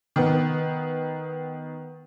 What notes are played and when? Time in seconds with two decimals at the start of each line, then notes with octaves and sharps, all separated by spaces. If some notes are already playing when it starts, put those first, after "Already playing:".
0.16 D#3 B3